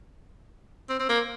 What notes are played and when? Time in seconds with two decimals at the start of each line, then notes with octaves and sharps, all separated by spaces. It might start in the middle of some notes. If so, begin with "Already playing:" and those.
0.89 C4
0.99 C4
1.09 A#3